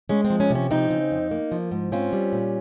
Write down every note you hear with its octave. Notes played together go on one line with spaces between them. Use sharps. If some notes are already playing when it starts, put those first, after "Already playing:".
G#3 C#4
C4
F3
C#4
C3
C#4
F3 C4 D#4
C#3
F2
A#3
F3
G#2
C4 C#4 F4
G3
A#2